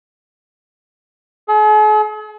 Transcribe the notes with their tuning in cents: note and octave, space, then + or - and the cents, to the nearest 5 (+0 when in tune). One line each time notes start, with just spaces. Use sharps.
G#4 +45